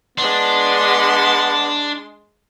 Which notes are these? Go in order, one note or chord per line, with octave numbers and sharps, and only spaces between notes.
G#3 B3 D4 C6